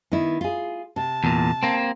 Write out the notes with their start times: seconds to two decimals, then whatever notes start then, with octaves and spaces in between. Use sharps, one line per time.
0.12 D#3 B3 E4
0.41 F4 G#4
0.96 C3 A5
1.24 E2 A#2
1.63 A#3 C4